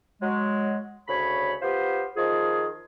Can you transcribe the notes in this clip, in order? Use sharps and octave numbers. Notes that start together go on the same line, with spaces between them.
F#3 G#3
D2 C#3 C#5 B5
B3 F4 G4 C5
D#3 F3 F4 G#4